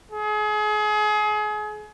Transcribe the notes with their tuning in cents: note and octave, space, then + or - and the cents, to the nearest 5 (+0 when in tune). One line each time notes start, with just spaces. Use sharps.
G#4 +30